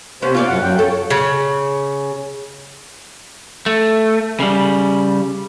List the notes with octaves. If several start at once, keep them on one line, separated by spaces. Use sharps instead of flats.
C3 B3 C#4 C5
A#3 F4 C#5 D5
F#2 F#5
F#2 F#3 G5
A4 C#5
C#3
A3
C#3 G3